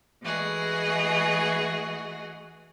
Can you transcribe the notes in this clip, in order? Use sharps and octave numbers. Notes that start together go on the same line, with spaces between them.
E3 G#3 A3 F#4 G#4 D#5